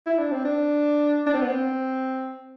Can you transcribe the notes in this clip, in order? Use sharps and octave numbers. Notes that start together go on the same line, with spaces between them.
E4
D4
C4
D4
D4
C4
B3
C4